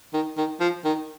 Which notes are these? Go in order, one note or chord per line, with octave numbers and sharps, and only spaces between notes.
D#3
D#3
F3
D#3